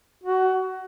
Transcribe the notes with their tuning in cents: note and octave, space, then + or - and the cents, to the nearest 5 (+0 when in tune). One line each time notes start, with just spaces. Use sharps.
F#4 +20